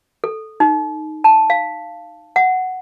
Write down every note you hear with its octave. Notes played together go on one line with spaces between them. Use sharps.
A4
D#4
A5
F5
F#5